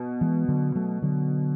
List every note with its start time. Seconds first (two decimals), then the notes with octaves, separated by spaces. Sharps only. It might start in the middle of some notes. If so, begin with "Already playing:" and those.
Already playing: B2
0.21 E3 G#3
0.48 D3 F#3
0.75 F#3 A3
1.02 D3 F#3